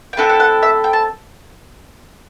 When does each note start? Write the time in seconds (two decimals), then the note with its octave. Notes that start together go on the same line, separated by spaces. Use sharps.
0.13 G5
0.17 A3 C4 E4 A4 F#5
0.29 F#5
0.40 F#5
0.63 E5
0.84 G5
0.93 A5